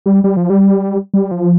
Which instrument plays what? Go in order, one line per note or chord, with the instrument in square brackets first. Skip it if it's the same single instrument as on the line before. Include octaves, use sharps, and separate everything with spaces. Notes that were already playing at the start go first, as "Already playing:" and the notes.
[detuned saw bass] G3
G3
F3
G3
G3
F3